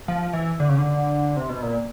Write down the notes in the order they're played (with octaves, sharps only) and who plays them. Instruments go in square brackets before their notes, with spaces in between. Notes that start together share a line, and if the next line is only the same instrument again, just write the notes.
[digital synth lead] F3
E3
D3
C#3
D3
C3
B2
A#2